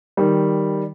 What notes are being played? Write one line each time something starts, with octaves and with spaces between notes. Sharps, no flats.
D#3 G3